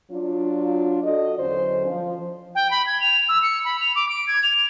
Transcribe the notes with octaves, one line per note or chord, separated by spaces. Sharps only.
F#3 D4 F4
F#4 A4 D5 D#5
E2 D3 F#3 C#4 C5
F3
G5
B5
G#6
F7
E6
C#7
B5
F7
D6
D7
G#6
F7